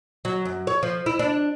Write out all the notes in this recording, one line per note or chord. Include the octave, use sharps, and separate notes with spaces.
F#3
F#2
C#5
F3
E4
D4